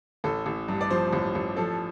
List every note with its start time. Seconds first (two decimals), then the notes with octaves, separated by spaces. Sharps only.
0.24 A1 A4
0.46 A1
0.68 G2
0.81 D5
0.90 F3 C5
1.13 A1
1.35 A1
1.56 F3 A4